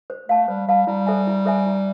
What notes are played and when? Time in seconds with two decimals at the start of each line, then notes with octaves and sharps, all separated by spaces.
0.10 C5
0.29 A3 F5 A5
0.48 G3 C5
0.68 G3 F5 A5
0.87 G3 E4
1.06 A4 C5 E5 G#5
1.27 E4
1.46 A4 C5 E5 G#5
1.66 E4